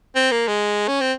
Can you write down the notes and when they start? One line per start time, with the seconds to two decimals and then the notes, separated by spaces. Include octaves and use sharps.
0.15 C4
0.31 A#3
0.48 G#3
0.88 C#4
1.01 C4